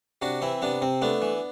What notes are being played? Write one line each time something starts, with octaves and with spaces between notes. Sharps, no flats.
C3 D4 F#4
E3 C4 E4
C3 B3 D4
C3 C4
A3 B3 D4
E3